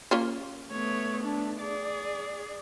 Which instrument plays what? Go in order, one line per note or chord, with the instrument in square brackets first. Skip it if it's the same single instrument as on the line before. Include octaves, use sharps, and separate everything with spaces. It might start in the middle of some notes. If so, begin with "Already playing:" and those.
[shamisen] A#3 C#4 F4
[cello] A3 B3 [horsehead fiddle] C#5
[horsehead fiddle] D4
[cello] G#4 [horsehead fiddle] D5